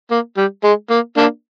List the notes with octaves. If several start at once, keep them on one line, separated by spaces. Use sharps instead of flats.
A#3
G3
G#3
A#3
A#3 D4